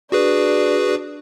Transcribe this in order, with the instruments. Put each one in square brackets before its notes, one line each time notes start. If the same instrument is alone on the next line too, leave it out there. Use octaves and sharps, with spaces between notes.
[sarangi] D4 [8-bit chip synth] F#4 G#4 B4